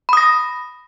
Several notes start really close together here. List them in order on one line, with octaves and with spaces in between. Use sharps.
B5 D#6 A#6